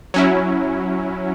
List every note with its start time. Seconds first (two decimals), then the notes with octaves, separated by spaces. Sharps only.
0.14 F#3 C#4 E4